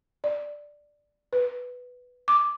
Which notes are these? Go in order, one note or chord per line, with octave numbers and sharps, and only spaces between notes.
D5
B4
D6